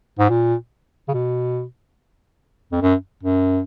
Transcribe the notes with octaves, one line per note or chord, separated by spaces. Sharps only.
G#2
A#2
C#3
B2
F2
F#2
F#2